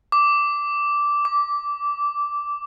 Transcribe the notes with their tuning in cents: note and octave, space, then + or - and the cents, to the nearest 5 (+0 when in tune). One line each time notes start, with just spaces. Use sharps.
D6 -10
D6 -20